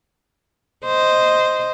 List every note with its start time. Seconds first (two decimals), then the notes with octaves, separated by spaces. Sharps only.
0.85 C5 D#5